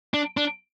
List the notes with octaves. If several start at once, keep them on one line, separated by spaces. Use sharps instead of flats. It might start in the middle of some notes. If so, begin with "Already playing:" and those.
D4
D4